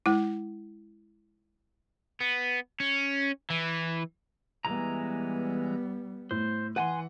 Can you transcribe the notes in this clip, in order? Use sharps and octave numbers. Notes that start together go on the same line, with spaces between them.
G#3 E4
B3
C#4
E3
E3 G3 G#3 B3 A#5
A2 C5
E3 B4 F#5 G#5 C6